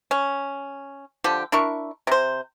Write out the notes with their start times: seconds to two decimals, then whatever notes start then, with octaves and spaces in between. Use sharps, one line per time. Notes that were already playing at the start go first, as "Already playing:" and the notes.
0.11 C#4
1.24 D3 F3 G4
1.52 D4 E4 A#4 C#6
2.07 C3 C5